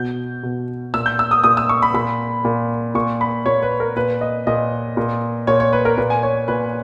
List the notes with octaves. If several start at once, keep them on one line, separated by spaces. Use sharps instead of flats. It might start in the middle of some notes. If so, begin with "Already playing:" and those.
Already playing: B2 G6
B2
A#2 E6
G6
E6
D#6
A#2 D#6
E6
C#6
B5
A#2 B5
A#2
A#2 C#6
B5
A#2 C#5
B4
A#4
A#2 B4
D#5
A#2 D#5
A#2
A#2 C#5
C#5
B4
A#4
A#2 B4
G#5
C#5
A#2 B4